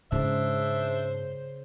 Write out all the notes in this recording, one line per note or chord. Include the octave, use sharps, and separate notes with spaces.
G#2 C#3 D4 C5 E5